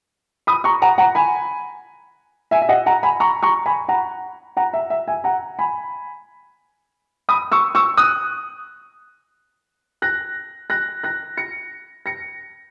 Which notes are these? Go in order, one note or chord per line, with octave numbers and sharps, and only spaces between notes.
B5 D#6
A#5 C#6
F#5 A#5
F#5 A#5
G#5 B5
E5 G#5
E5
D#5 F#5
F#5 A#5
G#5 B5
A#5 C#6
A#5 C#6
G#5 B5
F#5 A#5
F#5 A#5
E5
E5
E5 G#5
F#5 A#5
G#5 B5
B5 D#6
C#6 E6
C#6 E6
D#6 F#6
F#6 A#6
F#6 A#6
F#6 A#6
A#6 C#7
A#6 C#7